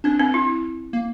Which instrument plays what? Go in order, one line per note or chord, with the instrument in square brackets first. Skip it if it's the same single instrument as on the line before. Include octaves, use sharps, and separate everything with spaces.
[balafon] C4 [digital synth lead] D4
[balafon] C4
E4
[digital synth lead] A#3